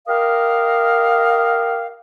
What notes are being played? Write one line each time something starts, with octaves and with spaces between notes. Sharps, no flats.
G4 A#4 D#5 F5